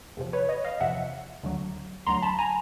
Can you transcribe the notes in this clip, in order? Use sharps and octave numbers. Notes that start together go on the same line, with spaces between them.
E2 C3 F3
B4 C#5
C#5 D#5
D#5 F5
E2 C3 F3 E5 F#5
D2 D3 F#3
D2 D3 F#3 A#5 C6
A5 B5
G#5 A#5